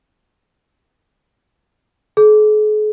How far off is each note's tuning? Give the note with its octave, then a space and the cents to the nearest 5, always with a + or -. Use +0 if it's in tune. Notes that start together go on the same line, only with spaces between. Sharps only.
G#4 +45